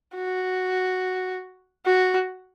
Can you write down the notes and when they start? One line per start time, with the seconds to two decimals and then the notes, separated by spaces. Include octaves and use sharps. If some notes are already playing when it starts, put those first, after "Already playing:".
0.15 F#4
1.86 F#4